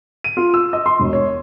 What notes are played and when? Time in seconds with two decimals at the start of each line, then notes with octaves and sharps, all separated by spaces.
0.24 D#7
0.37 F4
0.54 E6
0.73 D#5
0.86 C6
1.00 E1
1.13 C#5